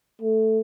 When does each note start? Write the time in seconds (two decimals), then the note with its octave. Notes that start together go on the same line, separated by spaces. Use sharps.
0.22 A3